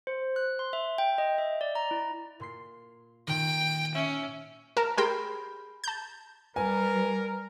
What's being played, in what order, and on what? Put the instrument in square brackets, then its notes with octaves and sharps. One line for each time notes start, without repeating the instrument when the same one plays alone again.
[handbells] C5
F#6
C6
E5
G5
D#5
E5
D5
A#5
E4
[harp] A#2 C6 C7
[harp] A#2 D#3 [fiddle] G5
[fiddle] C#4 [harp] E5
[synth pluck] A#4 [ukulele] A5
[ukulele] G4 G#4 B5 [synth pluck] A#4 C5 G5
[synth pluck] A5 G6
[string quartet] G3 [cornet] A#4 [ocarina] B4 [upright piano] G#5